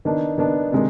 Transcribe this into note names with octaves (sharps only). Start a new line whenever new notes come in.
D#3 B3 D4
D#3 B3 D4
C3 D#3 G#3